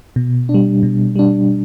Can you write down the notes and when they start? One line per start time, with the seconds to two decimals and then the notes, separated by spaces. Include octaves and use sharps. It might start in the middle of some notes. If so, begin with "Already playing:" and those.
0.16 B2
0.49 D4
0.54 G3
0.83 B2
1.16 G3 D4